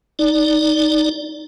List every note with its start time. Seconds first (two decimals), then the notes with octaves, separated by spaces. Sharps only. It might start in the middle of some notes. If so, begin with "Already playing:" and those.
0.19 D#4 D5